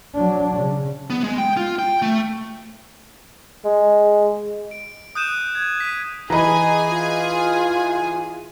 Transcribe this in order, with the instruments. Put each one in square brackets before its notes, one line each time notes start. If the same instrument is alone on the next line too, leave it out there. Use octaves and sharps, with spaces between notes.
[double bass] F#3 D4
C#3
[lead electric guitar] B3
G#3
G5
F4
G5
A3
[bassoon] G#3
[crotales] D7
D#6 F#6 G6 D#7 E7
G#6
B6 D#7
[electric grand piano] E3 D#5 [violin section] G#4 G#5 [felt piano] A#5 B5
[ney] F4